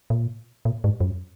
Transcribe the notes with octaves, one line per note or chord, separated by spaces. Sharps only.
A#2
A#2
G#2
F#2